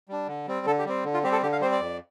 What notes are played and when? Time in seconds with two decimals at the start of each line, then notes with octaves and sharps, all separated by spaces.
0.09 G3 D4
0.27 D3
0.47 G3 C4
0.66 D3 A4
0.79 G4
0.85 G3 C4
1.05 D3
1.14 F4
1.23 G3 C4 G4
1.32 A4
1.42 D3 G4
1.52 F5
1.61 G3 C4 C5
1.72 D5
1.80 F2